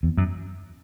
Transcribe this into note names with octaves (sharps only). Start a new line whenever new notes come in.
E2
F#2